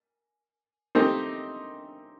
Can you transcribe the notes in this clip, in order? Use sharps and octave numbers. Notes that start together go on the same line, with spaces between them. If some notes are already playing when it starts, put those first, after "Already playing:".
A3 C4 D#4 G4